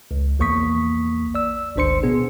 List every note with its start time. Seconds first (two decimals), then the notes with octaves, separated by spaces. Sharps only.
0.11 C#2
0.39 A#1 E2 A#3 C#6 D#6 B6
1.35 D5 E6
1.76 G#1 D2 D4 C5 C6 C#7
2.03 B2 B3 G#4